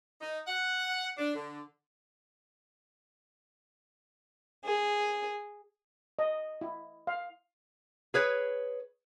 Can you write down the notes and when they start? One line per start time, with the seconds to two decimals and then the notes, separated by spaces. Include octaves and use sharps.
0.21 D#4
0.47 F#5
1.16 D4
1.35 D3
4.65 G#4
6.19 D#5
6.61 E4
7.07 F5
8.14 G#4 B4 C#5